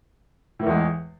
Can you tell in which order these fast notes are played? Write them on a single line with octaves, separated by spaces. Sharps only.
A2 E3 E2 G#3